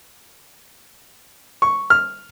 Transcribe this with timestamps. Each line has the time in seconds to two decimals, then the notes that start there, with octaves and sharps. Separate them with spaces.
1.62 C#6
1.90 F6